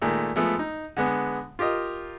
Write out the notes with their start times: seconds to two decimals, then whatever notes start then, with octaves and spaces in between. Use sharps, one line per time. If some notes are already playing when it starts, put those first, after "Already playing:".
0.02 A#2 D#3 G#3 A3
0.36 F3 G#3 A3 B3
0.59 D#4
0.97 D3 G#3 B3
1.59 F4 G4 A#4 D#5